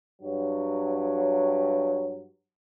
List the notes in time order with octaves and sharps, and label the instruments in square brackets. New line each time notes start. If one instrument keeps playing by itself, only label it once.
[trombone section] G2 F#3